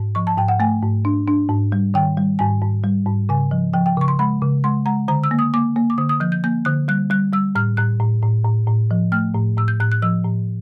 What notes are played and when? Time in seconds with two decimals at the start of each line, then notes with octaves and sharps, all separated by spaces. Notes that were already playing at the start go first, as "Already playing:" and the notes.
Already playing: G#2
0.15 F3 C#6
0.27 A5
0.37 G#2 G5
0.48 F#5
0.60 A3 G#5
0.82 G#2
1.05 D4
1.28 D4
1.50 G#2
1.72 G3
1.94 D#3 G5
2.17 G3
2.39 G#2 G#5
2.62 G#2
2.84 G3
3.07 G#2
3.29 C#3 G#5
3.51 F3
3.73 F3 G5
3.86 G5
3.97 C#3 C#6
4.08 C6
4.19 G#3 B5
4.42 C#3
4.64 G#3 C6
4.86 G#3 A#5
5.08 D3 A#5
5.24 E6
5.31 A#3
5.39 D#6
5.54 A#3 D6
5.76 A#3
5.90 D6
5.98 D3 D#6
6.09 D#6
6.20 F3 G6
6.32 G6
6.44 A#3 G6
6.65 D3 F#6
6.88 G3 F#6
7.10 G3 F#6
7.32 G3 E6
7.55 A2 F6
7.77 A2 F#6
8.00 A2
8.22 A2
8.45 A2
8.67 A2
8.91 F3
9.12 A3 F6
9.34 A2
9.57 A2 E6
9.68 G6
9.80 A2 F#6
9.92 F#6
10.02 F3 E6
10.25 A2